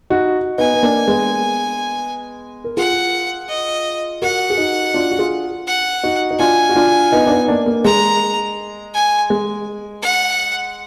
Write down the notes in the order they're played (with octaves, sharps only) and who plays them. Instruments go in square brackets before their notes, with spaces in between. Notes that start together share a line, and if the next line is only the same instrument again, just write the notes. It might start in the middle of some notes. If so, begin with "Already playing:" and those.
[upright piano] D#4 F#4
[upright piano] B3 D#4 [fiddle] G#5
[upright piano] B3
A#3 D4
G#3 B3
A#4
[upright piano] F4 G#4 [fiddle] F#5
[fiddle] D#5
[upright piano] F#4 A#4 [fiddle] F#5
[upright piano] G#4
D#4 F#4
D4 F4
F#4
F4 G#4
[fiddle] F#5
[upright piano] D#4 F#4
D#4
[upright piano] D4 F4 [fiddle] G#5
[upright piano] F#4
D4 F4
B3 D#4
D4
B3 D#4
A#3 D4
A#3
[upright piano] G#3 [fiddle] A#5
[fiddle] G#5
[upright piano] G#3
[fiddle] F#5